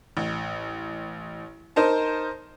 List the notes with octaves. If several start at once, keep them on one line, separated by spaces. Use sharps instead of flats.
A1
D#4 A#4 C5 A5